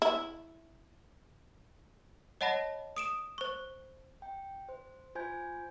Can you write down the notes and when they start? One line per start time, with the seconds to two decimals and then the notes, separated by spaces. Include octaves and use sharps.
0.02 E4
2.41 C#5 D#5 F#5 A5 B5 A#6
2.97 D#6 D7 E7
3.38 C5 C#6
4.22 G5
4.69 C5
5.15 F4 C5 G#5 G6 G#6